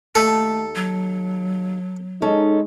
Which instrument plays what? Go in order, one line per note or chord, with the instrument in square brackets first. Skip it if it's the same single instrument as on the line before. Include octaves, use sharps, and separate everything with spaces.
[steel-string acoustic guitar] D#2 A5 [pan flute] A3 [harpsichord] A4
[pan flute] F#3
[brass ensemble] G#3 D#4 [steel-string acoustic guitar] C#4 A4 D#5